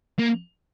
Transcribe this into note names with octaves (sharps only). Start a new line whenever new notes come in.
A#3